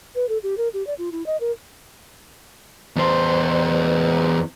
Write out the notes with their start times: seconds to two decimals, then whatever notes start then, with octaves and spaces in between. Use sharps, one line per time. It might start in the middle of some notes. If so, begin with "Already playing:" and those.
0.15 B4
0.29 A4
0.43 G4
0.57 A#4
0.74 G4
0.87 D5
0.98 F4
1.12 E4
1.26 D#5
1.40 A#4
2.96 E2 C5